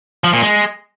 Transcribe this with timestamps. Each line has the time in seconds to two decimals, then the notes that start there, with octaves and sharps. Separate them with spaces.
0.24 F3
0.33 A#2
0.42 G#3